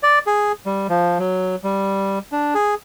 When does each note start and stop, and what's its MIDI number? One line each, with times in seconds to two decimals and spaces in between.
0.03 0.19 74
0.27 0.52 68
0.66 0.87 55
0.89 1.18 53
1.19 1.56 54
1.64 2.19 55
2.32 2.54 62
2.55 2.75 68